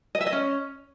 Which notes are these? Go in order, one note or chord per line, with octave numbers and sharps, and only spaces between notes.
D#5
E5
D#5
C#4